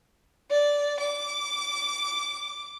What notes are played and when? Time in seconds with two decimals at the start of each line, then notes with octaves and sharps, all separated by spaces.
0.51 D5
1.00 D6